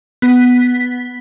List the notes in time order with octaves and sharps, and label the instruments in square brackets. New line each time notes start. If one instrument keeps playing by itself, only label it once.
[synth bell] B3 B6